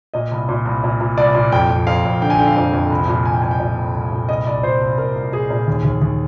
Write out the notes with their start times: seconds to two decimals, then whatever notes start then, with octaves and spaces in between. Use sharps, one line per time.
0.14 A#2 D#5
0.31 C2
0.49 A#2
0.65 C2
0.84 A#2
1.01 A#2
1.18 C2 D5
1.35 A#2
1.52 F2 G5
1.70 F2
1.87 F2 F5
2.05 F2
2.22 D3 G5
2.30 G#5
2.39 D3 G5
2.48 F5
2.57 F2 G5
2.73 F2
2.90 C2
3.08 A#2
3.25 C2 G#5
3.33 G5
3.42 C2 G#5
3.51 G5
3.60 A#2
3.77 C2
3.94 C2
4.12 A#2
4.29 C2 D#5
4.47 C2 D5
4.63 A#2 C5
4.81 C2
4.98 A#2 A#4
5.15 C2
5.32 A#2 G#4
5.50 A#2
5.67 D#2
5.85 D#2
6.02 D#2